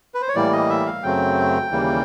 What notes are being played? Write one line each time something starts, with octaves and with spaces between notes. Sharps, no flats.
B4
C5
C#5
A2 E3 G3 A#3 D5
D#5
E5
F5
F#2 C#3 F#3 A3 C4 G5
D#2 C#3 E3 G3 A#3